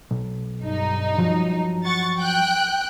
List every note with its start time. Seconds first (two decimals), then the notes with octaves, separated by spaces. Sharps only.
0.11 B1
0.61 G2 D#4
1.18 F3 F#3 A#5
1.85 F#5 C#6 A6
2.17 G5 F#6